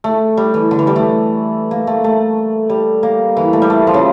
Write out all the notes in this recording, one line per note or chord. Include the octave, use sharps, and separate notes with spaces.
A3
G3
E3
D3
E3
G3
A3
A#3
A3
A3
G3
A#3
E3
A3
G3
A3
F3
C#3